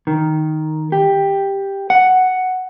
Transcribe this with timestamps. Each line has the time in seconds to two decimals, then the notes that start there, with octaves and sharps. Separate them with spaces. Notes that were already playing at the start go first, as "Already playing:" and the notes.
0.07 D#3
0.92 G4
1.90 F#5